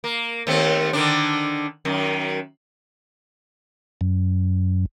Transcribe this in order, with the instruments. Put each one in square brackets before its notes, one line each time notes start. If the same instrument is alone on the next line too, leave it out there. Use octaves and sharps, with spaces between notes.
[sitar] A#3
D#2 A3 C4
D3 D#3 D4
F#2 D#3
[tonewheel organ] F#2